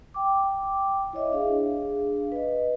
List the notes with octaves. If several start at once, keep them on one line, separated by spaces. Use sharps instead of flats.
G5 D6
E4 C#5 D#5 E5
D4 G#4 F5
B4 D#5